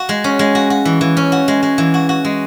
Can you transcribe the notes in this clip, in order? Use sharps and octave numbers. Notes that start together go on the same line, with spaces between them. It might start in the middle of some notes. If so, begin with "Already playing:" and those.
Already playing: F#4
G#3
C#4
G#3
F#4
F#4
E3
E3
C#4
F#4
G#3
G#3
E3
F#4
F#4
G#3